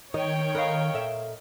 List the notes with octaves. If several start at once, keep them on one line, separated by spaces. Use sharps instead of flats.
D#3 C#5 D#5 G5
D#4 A#4 B4 D#5 F5
A#2 A4 E5